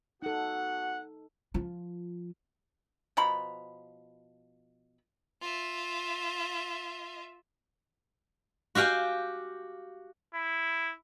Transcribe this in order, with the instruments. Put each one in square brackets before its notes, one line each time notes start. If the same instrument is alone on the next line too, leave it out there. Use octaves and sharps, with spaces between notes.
[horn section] B3 F#4 F#5 [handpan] D#4 A4
[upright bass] F3 F4
[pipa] B2 F3 A#5 B5
[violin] F4 E5
[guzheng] F#4 G4 F5 G5 G#5
[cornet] E4